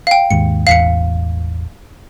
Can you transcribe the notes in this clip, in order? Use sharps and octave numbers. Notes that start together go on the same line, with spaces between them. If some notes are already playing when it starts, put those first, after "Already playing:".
F5 G5
D#2 G#2 C#7
E1 A1 E2 F5 B6 C#7